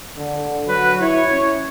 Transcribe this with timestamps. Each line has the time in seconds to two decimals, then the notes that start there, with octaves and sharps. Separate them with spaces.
0.17 D3
0.67 F#3 F#4 B4
1.00 E4 C#5
1.31 C#4